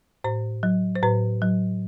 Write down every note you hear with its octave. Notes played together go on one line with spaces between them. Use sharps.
A2 C5
F#3
C5
A2 B4
F#3